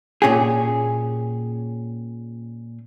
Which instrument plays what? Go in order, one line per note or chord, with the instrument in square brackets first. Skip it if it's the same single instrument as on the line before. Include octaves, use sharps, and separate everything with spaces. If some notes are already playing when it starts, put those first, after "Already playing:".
[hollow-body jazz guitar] A#2 C#4 G4 G#4